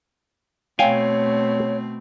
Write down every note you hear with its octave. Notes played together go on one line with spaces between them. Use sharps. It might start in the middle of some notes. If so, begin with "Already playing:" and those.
B2 A3 C4 C#5 F5 G5 G#5